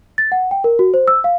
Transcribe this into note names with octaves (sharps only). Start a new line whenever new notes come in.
A6
F#5
G5
A#4
F#4
C5
E6
F5